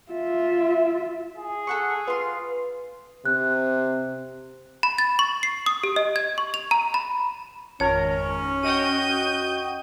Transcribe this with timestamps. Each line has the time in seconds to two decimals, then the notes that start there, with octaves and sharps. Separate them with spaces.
0.12 F4 E5
1.37 G#4
1.67 A4 F#5 C#6
2.07 F4 B4 C6
3.25 C3 C4 F#6
4.83 B5
4.98 A6
5.19 C#6
5.43 C7
5.66 D#6
5.84 G4
5.96 D#5
6.16 G#6
6.38 C#6
6.54 F7
6.71 A#5
6.94 B5
7.80 G#1 F2 C#4 A#4 C#5
8.63 F#4 D#5 G5 G6 D#7